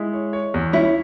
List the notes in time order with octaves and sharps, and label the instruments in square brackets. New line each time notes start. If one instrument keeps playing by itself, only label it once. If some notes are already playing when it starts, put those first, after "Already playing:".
Already playing: [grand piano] G#3 [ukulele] E4
[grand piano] C#5
C#5
E2
[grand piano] C#4 [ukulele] E4